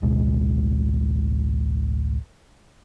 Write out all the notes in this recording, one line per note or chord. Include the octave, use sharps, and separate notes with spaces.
A1 D2 B2 G#3